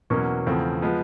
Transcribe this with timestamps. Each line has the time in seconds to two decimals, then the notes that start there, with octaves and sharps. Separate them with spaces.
0.10 E2 B2 F#3 A#3 C#4
0.46 E2 C#3 F3 A3 C4
0.82 F3 G#3 B3